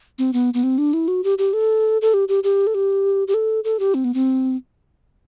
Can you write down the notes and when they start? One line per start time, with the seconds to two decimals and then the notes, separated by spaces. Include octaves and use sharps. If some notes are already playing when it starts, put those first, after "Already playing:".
0.19 C4
0.33 B3
0.54 B3
0.63 C4
0.78 D4
0.93 E4
1.08 F#4
1.24 G4
1.38 G4
1.53 A4
2.02 A4
2.14 G4
2.28 G4
2.44 G4
2.67 A4
2.74 G4
3.28 G4
3.34 A4
3.64 A4
3.79 G4
3.94 C4
4.04 B3
4.14 C4